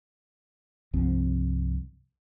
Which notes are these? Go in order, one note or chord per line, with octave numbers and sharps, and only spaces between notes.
C2 G2 F3 C4